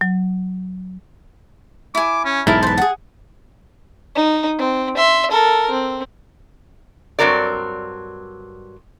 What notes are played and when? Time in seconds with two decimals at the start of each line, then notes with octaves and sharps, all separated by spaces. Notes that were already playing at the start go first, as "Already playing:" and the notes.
0.01 F#3
1.95 E4 G#5 D6
2.25 C#4
2.47 B1 E2 G#2 E4 A#4 A5
2.63 B4 C5
2.78 G#4 F#5
4.15 D#4
4.59 C4
4.97 E5 C6
5.31 A4 A#4
5.70 C4
7.19 G2 C3 F#3 C4 A#4 D5